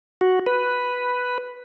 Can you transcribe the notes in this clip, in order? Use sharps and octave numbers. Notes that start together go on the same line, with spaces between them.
F#4
B4